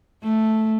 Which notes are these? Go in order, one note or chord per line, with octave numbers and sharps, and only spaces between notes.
A3